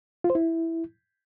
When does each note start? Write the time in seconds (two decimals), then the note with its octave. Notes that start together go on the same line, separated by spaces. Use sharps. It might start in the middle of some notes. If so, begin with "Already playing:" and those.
0.24 F4
0.30 C5
0.35 E4